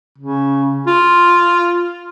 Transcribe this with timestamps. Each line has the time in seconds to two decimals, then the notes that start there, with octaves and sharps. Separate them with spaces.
0.18 C#3
0.87 F4